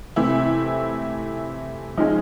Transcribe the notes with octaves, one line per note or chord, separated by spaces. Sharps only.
C3 E3 A3 C4 E4
F3 G#3 C#4 D#4